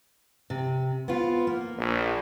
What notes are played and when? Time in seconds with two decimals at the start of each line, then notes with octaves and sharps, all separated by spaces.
0.50 C3
1.08 B3 C4 F4
1.47 A#3
1.78 A#1